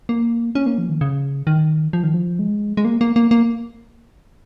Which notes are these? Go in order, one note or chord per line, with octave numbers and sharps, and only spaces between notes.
A#3
C#4
A#3
F3
D#3
C#3
D#3
F3
D#3
F3
G#3
G#3
A#3
A#3
A#3
A#3